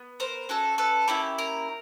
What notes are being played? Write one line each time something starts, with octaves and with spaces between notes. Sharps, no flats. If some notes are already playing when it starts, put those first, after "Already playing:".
Already playing: B3
A#4 C5
C#4 F#4 A4
A4 B4
A#3 C#4 E4 G4
A#4